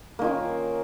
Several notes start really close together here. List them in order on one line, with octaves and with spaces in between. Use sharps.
A#3 D#3 F4 C#4